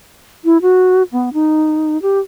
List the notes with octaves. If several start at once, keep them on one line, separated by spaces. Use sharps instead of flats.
E4
F#4
B3
D#4
G4